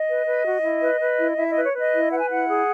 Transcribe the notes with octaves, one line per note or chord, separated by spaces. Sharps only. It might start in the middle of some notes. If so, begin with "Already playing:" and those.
Already playing: D#5
B4
B4
F#4
E4
B4
B4
E4
E4 E5
D#5
B4
C#5
B4 D#5
E4
B4 F#5
G#5
E4 F#5
G#4